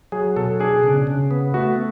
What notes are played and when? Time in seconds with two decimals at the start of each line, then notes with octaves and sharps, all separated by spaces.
0.12 F#3 G#4
0.36 B2 A4
0.60 D4 G#4
0.83 C#3
1.07 C#3
1.31 B3
1.54 A3 F#4